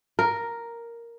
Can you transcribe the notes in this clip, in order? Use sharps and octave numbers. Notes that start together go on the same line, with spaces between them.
A#4